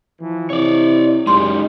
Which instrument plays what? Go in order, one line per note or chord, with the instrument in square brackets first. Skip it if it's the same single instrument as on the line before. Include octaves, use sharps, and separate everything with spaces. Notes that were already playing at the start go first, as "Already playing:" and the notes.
[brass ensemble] E3 F3
[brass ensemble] C3 E4 [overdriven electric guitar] C#5 D5
[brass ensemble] F#2 C#3 D#4 [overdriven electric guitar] G#3 G4 [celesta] C6